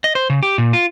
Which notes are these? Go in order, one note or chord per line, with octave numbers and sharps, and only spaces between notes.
D#5
C5
C#3
G4
A#2
F4